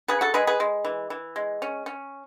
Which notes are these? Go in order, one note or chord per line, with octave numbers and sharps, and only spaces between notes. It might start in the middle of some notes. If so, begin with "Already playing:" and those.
C#3 G#4 B4
F#4 A4
G#3 G#4 B4
G#4 B4
G#3
E3
E3
G#3
C#4
C#4